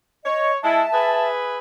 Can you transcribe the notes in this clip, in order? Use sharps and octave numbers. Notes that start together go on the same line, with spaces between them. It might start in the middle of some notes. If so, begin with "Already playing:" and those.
C#5 D#5
G#3 E4 E5 A5
E4 G#4 B4